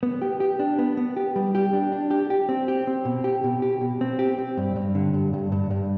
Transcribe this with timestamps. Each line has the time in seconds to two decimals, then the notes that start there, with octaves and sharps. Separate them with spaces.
0.03 B3
0.22 G4
0.40 G4
0.59 D4
0.79 B3
0.97 B3
1.16 G4
1.36 G3
1.55 G4
1.73 D4
1.92 D4
2.11 G4
2.30 G4
2.49 C4
2.68 G4
2.87 C4
3.05 B2
3.24 G4
3.44 B2
3.62 G4
3.81 B2
4.01 C4
4.19 G4
4.38 C4
4.57 G2
4.76 G2
4.95 D3
5.14 G2
5.33 G2
5.52 G2
5.71 G2